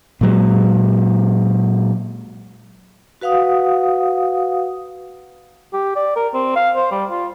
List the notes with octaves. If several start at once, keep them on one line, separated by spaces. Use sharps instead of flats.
A#2 F#3 G#3
F#4 B4 F5 F#5 D#6
G4
D5
A#4
C4
F5
C5
G3
F4